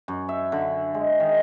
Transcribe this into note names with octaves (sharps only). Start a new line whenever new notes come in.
F#2
E5
D3
G#3
D#3